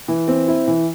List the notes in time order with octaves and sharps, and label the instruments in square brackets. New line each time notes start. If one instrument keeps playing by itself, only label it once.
[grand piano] E3
C4
E4
E3